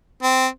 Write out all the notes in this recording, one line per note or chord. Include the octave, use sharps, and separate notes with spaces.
C4